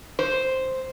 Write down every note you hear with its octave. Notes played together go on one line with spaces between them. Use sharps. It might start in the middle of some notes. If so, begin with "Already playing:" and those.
C5